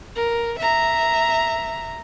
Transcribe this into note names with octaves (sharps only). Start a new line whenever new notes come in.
A#4
E5 A#5